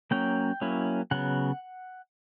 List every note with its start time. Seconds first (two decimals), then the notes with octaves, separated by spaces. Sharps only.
0.11 F#3 A#3 C#4 G5
0.61 F#3 A#3 C#4 E4
1.11 C#3 F#3 B3 F#5